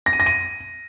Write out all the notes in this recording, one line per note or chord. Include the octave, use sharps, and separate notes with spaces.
A#6
D#7
A#6
D#7